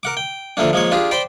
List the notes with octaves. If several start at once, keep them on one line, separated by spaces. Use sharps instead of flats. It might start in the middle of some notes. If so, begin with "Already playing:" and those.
A#4 F#5 D6
G5
D3 F3 A3 A#3 D4
F3 G#3 A#3 C#5
D4 F4 G4 G#4
C5 D5 G5 B5 C6